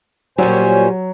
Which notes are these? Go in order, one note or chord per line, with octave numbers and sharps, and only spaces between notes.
A#2 F#3 G3 C#4 C5 G#5